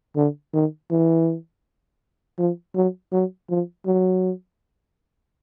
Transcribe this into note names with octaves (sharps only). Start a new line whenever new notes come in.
D3
D#3
E3
F3
F#3
F#3
F3
F#3